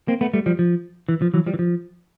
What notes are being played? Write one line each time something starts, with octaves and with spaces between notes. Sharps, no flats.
A#3 C4
A3 B3
G3 A3
F3 G3
F3
E3
F3
E3 F#3
F3 G3
E3
F3